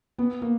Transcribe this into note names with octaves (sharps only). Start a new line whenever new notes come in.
B3
A#3